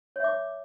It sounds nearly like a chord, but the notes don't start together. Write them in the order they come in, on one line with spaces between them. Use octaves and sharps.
C#5 E5 D6